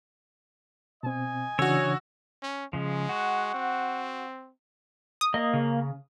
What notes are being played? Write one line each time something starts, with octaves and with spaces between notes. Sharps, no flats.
B2 C4 D#5 G#5
C#3 E3 D4 F#4 C#5 E6
C#4
C#3 F3 G#3
F#4 F#5
C4
D#6
A#3 D#5
C#3